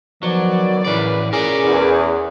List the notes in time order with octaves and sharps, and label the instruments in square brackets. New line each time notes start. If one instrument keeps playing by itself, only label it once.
[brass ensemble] D#3 B3 D5 [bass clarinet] F3 [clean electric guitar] F#3
[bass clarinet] A2 [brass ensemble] C#3 A#4 B4 [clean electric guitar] E3 D5
[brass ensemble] C#4 [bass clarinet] G#4 [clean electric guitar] A#4 D5
[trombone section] E2